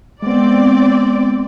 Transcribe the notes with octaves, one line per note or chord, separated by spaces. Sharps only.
G#3 B3 C4 D5